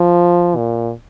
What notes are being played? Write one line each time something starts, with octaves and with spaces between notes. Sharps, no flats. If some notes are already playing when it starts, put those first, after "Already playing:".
Already playing: F3
A#2